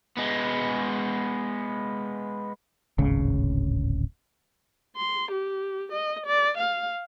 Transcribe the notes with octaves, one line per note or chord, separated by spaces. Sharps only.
G#3 B3
D1 G#1 C#3
C6
G4
D#5
D5
F5